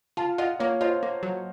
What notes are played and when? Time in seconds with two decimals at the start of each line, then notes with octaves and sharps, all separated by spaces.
0.17 F4 F5 A5
0.38 F4 D#5 F#5
0.59 A#3 C#5 F5
0.81 F4 C5 D#5
1.03 A#3
1.23 F#3